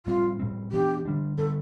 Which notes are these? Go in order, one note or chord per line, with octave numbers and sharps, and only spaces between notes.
A2 G3 C4 F4
A2 G3 C4
E3 B3 D4 G4
D3 G3 D4
D3 G3 B3 A4